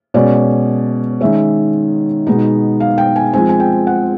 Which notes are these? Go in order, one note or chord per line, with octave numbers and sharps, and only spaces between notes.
B2 G#3 C#4 D5
D#3 G#3 C#4 E5
B2 G#3 B3 D#4
F5
G5
G#5
F3 G#3 C4 G#5
G#5
G5
F#5